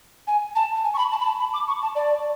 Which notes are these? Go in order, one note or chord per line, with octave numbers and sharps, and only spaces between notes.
G#5
A5
G#5
C#6
B5
A5
B5
A5
B5
D6
C#6
A5
D5